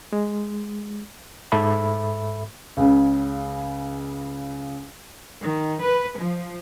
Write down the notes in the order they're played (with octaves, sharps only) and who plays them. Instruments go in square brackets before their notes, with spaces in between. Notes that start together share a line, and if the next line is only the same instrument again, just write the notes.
[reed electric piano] G#3
G#2 A4 E5 B5
[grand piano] C#2 C#3
[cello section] D#3
B4
F3